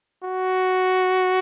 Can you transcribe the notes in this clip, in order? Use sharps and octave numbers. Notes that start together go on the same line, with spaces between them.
F#4